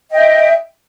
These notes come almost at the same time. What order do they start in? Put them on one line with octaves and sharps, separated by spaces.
D#5 G5 E5